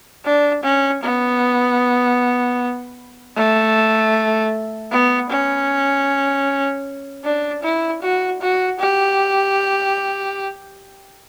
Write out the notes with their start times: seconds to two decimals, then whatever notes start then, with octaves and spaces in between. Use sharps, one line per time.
0.25 D4
0.63 C#4
1.03 B3
3.36 A3
4.91 B3
5.30 C#4
7.24 D4
7.63 E4
8.02 F#4
8.41 F#4
8.80 G4